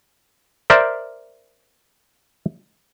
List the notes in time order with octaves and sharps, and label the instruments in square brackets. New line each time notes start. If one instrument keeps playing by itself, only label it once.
[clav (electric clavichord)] A#4 C5 D5 E5